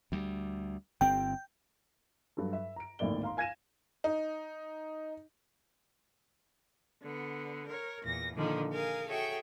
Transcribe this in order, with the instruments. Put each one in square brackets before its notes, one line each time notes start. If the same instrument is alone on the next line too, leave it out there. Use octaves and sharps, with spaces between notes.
[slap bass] D2 G3
[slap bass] G1 C4 [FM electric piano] G5
[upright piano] G2 F#3 A4
E5
A#5 D7
G#1 D2 A2 A#3 D5 G7
F5 A#5 C6
F5 G#5 G#6 A#6 D#7 E7
[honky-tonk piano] D#4
[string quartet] D3 B3
A#4 C#5
E2 A#2 A#6
A#2 D3 D#3 F3 A#3
G#4 A#4 F5 G#5
F#4 G#4 A4 C#5 E5 G5